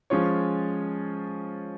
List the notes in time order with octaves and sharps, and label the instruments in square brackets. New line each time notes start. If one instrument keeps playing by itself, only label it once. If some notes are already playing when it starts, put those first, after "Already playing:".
[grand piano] F3 G#3 C#4 F4 C#5